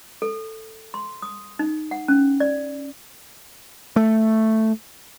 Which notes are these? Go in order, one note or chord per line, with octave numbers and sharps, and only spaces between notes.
A4
C6
D#6
D#4
F#5
C#4
D5
A3